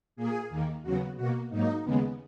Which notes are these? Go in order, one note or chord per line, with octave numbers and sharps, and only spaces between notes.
A#2 A#3 G#4
D#2 D#3 A#3
D#2 C#3 F#3 B3 F#4
B2 A#3 F#4
G#2 F#3 A#3 D#4
D#2 C#3 G#3 B3